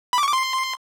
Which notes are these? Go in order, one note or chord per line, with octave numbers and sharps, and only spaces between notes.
B5
D6
C#6
D6
C6